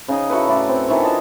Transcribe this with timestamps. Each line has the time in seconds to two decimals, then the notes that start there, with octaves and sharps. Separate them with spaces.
0.08 C#3 D#4 D#5
0.30 E4 F#4 A4 B4
0.48 A2 E4 D5
0.69 C4
0.88 D#3 E3 D4 C#5
1.04 F4 D#5 A5